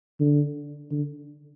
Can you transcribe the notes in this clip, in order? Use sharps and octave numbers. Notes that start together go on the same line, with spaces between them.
D3
D3